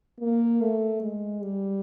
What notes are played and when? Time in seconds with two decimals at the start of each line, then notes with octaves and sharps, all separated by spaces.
0.20 A#3
0.61 A3
1.02 G#3
1.42 G3